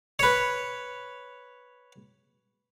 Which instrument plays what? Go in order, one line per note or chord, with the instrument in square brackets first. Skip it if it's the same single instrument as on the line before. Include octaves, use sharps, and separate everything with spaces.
[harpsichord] B4 C#5